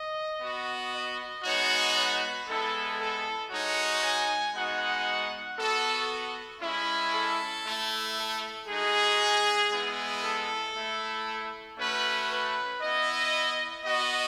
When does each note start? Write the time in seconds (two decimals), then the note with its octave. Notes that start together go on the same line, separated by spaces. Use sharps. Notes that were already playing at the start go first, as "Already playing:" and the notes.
Already playing: D#5
0.40 B3 F#4
0.92 D#5
1.43 G#3 B3 D#4 F#4 C#5
1.96 B4
2.47 G#3 B3 E4 A4
2.99 A4
3.50 G#3 D#4 F#4 C#5
4.02 G#5
4.54 G#3 B3 D#4 F#4 F#5
5.57 B3 F#4 A4
6.60 G#3 C#4 E4
7.12 A4
7.64 A3 E4
8.15 A4
8.67 G#3 D#4 F#4 G#4
9.70 G#3 B3 E4
10.22 A4
10.74 A3 E4
11.77 A3 C#4 F#4 B4
12.30 B4
12.81 B3 E4 D#5
13.84 B3 F#4 D#5